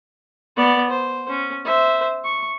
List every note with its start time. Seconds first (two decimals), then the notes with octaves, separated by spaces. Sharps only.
0.57 B3 D5
0.90 C5
1.29 C#4
1.65 C5 E5
2.24 C#6